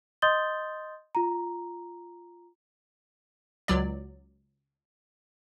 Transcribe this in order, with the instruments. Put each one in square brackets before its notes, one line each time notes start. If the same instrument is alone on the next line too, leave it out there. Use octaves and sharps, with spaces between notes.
[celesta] D#5 C6 D#6 G6 A6 G7
F4 A#5
[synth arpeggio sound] C#2 F#3 D5